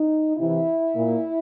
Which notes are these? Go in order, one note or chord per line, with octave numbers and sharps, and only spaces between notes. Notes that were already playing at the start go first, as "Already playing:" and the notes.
Already playing: D#4
C3 E3 E4
A#2